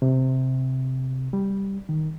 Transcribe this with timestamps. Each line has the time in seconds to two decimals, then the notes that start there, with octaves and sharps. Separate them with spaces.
0.02 C3
1.33 G3
1.89 D#3